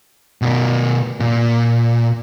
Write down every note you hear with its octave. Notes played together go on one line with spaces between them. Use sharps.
B2 A#4
A#2